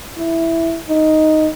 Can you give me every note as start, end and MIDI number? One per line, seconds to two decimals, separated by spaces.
0.18 0.79 64
0.89 1.49 63